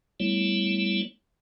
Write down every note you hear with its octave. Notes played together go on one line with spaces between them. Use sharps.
G3 A3 B3 E4 C#5